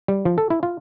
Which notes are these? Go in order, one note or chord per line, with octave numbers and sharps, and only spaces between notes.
G3
F3
A4
E4
F4